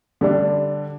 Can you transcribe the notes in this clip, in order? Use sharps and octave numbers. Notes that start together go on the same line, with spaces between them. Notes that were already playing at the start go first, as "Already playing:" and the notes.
D3 G3 D4